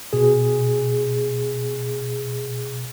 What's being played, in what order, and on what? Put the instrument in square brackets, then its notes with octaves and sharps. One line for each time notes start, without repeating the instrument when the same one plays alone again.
[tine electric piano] B2 G#4